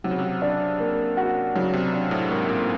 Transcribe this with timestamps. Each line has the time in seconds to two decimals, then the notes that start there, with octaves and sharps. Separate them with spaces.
0.04 C3 F#3
0.11 C#3
0.19 C3
0.42 D4
0.80 A#3
1.17 F#4
1.55 C#3 F#3
1.73 C3
1.93 D4
2.11 A2
2.31 G#2 A#3
2.49 A#2